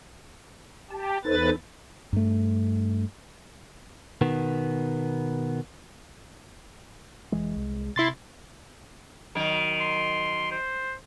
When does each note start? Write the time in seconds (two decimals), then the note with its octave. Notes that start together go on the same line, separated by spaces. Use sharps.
0.90 G4 A5
1.25 E2 D#4 A4 B4 C5 A6
2.13 G2 A3
4.21 B2 D#3 B3
7.32 F1 E3 G#3
7.56 C2
7.96 C3 E4 C6 A6
9.35 D#3 F#3 A#4
9.80 C6
10.51 C5